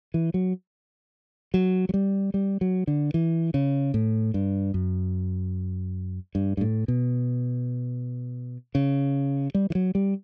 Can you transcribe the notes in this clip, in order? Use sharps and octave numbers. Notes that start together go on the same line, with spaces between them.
E3
F#3
F#3
F#3
G3
G3
F#3
D3
E3
C#3
A2
G2
F#2
G2
G2
A2
B2
C#3
G3
E3
F#3
G3